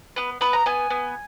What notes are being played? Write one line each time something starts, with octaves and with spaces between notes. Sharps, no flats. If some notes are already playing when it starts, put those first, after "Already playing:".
B3 B4
B3 B4
A#5
B3 G#5
B3